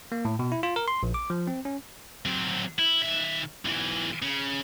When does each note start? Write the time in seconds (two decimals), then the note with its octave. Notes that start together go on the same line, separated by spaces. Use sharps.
0.12 A#3
0.25 A2
0.39 B2
0.52 E4
0.63 F4
0.76 A#4
0.88 C6
1.03 A#1
1.14 D6
1.30 F3
1.47 C4
1.65 C#4
2.26 F#3 C4
2.79 E4
3.02 D#3 E5
3.65 B1 E3
4.22 C#3